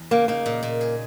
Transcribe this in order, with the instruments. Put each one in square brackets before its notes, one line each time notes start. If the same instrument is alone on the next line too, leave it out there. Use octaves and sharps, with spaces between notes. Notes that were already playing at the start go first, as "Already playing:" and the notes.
Already playing: [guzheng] E2
[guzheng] C#3 [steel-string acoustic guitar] A#3
[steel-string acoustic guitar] A#3 [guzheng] D#4
[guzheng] A#2
A#2
G#4